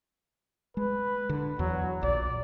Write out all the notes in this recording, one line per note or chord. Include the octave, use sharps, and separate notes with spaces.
G#3 B4
D3
E2 F#3
A#1 D5